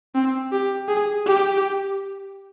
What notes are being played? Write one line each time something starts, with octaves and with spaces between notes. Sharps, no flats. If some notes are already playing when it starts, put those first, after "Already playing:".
C4
G4
G#4
G4